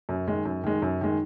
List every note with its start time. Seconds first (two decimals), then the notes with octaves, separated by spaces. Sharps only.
0.09 F#2
0.28 D#3 G#3
0.45 F#2
0.64 D#3 G#3
0.82 F#2
1.01 D#3 G#3